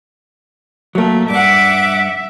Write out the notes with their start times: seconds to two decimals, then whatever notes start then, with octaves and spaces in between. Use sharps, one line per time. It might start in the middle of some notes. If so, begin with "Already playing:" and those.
0.95 F#3 A3 A#3
1.30 G2 E5 F#5 D6